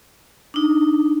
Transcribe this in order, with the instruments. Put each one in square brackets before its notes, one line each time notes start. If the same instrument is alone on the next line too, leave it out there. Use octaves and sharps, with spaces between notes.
[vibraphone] D4 D#4